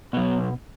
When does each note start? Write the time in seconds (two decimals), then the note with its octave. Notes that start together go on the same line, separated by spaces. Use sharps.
0.13 B2 F#3 B3